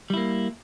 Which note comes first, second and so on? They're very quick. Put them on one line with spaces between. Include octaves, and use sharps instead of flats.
G3 E4 A#3